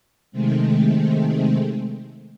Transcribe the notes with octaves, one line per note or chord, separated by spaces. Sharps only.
C3 D#3 G#3 A3 C4